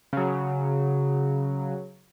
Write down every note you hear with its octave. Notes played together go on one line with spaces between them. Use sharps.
C#3 F#3